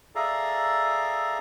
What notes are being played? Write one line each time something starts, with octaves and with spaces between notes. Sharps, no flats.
G#4 A4 D5 E5 F5 A#5